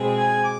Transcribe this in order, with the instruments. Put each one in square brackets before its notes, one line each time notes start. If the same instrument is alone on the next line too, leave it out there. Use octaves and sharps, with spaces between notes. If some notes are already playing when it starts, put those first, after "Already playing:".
Already playing: [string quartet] B2 G#3 C4 G#4
[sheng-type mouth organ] G#5
D6